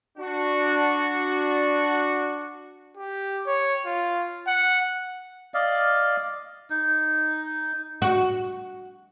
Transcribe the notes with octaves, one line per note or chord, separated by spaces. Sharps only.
D4 F#4
G4
C#5
F4
F#5
D5 D#5 F5
D#4
F#4